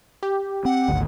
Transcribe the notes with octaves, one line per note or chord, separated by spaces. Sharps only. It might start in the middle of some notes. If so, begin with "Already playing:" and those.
G4
C4 F#5
G#1 D2